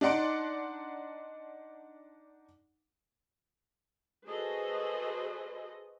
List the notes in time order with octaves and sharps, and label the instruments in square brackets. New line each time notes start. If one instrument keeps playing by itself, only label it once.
[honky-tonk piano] D4 D#4 D5 F#5 C6 D7
[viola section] F#4 G#4 A4 B4 C5 D#5